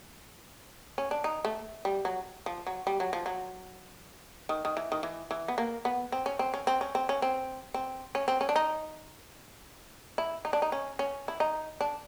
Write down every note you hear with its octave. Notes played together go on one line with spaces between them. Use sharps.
C#4
D4
D#4
A3
G3
F#3
F3
F#3
G3
F#3
F3
F#3
D#3
D#3
E3
D#3
E3
E3
B3
A#3
B3
C4
C#4
C4
C#4
C4
C#4
C4
C#4
C4
C4
C#4
C4
C#4
D4
D#4
E4
D#4
D4
D#4
C#4
C#4
E4
D#4
D4